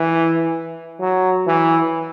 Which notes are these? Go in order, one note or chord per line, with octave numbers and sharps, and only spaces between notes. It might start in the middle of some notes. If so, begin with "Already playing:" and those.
Already playing: E3
F#3
E3